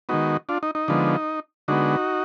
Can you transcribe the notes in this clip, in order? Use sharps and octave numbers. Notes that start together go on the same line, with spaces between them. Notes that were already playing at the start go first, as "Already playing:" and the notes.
D#3 G#3 B3 D#4 F#4
D4 F4
D#4
D#4
D3 F3 G#3 B3
D3 G#3 B3 D#4 F#4